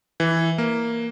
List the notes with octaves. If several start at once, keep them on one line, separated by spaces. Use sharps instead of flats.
E3
A#3